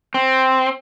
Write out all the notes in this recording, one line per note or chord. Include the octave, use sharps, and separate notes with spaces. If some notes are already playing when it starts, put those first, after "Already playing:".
C4